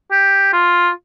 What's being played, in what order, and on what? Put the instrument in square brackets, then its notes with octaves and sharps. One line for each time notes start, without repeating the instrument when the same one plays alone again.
[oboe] G4
F4